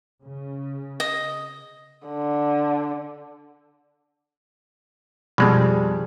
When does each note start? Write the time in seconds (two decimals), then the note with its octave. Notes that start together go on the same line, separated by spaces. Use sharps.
0.23 C#3
1.00 D#5
2.07 D3
5.38 F2 B2 G3 G#3 C4 G#4